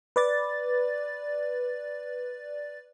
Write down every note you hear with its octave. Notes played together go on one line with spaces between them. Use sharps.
B4 D5 A6